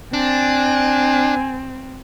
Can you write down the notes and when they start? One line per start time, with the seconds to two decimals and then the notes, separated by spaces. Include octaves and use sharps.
0.13 C4 D4 G#5